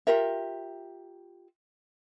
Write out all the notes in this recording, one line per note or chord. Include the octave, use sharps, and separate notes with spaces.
F4 G4 A#4 E5